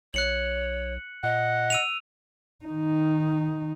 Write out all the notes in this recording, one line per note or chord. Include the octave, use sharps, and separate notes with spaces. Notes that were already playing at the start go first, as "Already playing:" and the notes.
B1 C#5 F#6 C#7 F#7
A#2 D#5 F#5
E6 D#7 F7
D#3 D#4